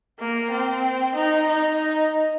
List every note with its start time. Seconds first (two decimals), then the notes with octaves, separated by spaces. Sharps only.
0.19 A#3
0.51 C4
1.15 D#4
1.47 D#4